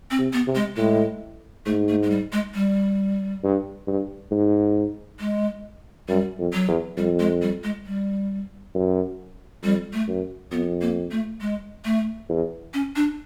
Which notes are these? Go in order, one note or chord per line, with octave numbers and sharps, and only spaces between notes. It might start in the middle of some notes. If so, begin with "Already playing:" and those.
C4
C3
B3
C3
G#3
A2 G#3
G#2 A3
A3
G#3
G3
G#3
G3
G2
G2
G#2
G#3
F#2 G3
F2
F#3
E2
F2 G3
G#3
G3
G#3
G3
F#2
F2 G3
A3
F#2
F2 B3
A#3
A3
G#3
A3
E2
C#4
D4